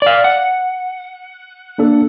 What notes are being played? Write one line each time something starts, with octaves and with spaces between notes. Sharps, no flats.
D5 F5
F#5
A#3 D4 A4